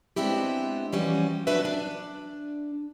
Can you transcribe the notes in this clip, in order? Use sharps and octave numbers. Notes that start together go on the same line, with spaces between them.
G#3 B3 C4 D4 E4 G4
E3 F3 G3 C#4 F#4
F#3 B3 D4 F#4 B4 E5
D4